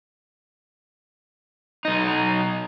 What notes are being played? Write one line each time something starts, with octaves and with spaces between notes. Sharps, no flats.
B1 D#4